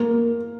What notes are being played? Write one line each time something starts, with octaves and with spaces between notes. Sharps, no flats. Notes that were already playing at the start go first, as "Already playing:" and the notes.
Already playing: A#3